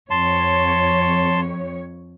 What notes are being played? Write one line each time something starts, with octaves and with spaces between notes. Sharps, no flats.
F2 C#5 A5 C6